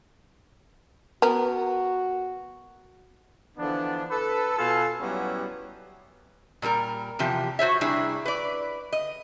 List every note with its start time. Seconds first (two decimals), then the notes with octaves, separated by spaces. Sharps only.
1.22 B3 F#4 A#4
3.57 D3 E3 F3 B3 D4
4.10 A4 B4
4.57 B2 F4 A4 F5 G#5 A5
5.00 F#3 G3 B3 C#4 E4 G4
6.62 A#2 G3 A4 A#4
7.19 E2 C3 F3 G4
7.59 F#4 C5 C#5 E5
7.81 C3 G3 D4 E4 G#4
8.26 B4 D5
8.92 D#5